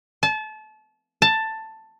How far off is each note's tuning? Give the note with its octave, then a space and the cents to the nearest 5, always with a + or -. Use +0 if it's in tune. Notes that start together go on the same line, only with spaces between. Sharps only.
A5 -30
A5 +10